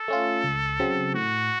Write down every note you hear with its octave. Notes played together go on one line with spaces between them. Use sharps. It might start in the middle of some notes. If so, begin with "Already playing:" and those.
Already playing: A4
A3 C#4 F4
C#2
C#3 F#3 C4
A2 F#4